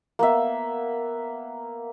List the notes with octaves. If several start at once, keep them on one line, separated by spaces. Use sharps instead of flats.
A#3 B3 E5